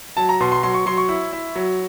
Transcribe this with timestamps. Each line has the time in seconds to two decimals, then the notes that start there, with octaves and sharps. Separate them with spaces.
0.17 F#3 A5
0.29 A#5
0.40 B2 C6
0.52 C6
0.63 F#3 C6
0.74 C#6
0.86 F#3 C6
0.97 C#6
1.09 E4
1.33 E4
1.56 F#3